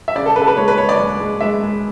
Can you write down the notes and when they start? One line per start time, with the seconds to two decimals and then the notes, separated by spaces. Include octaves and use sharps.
0.08 E5
0.15 C#3 D5
0.26 A4
0.36 C#3 B4
0.42 A4
0.48 B4
0.57 G#3 C#5
0.68 B4
0.78 G#3 C#5
0.89 D5
0.99 C#2
1.20 G#3
1.41 G#3 E5
1.62 G#3